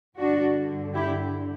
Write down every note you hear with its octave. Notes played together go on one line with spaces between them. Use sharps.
G2 D3 D4 F#4
E4 G4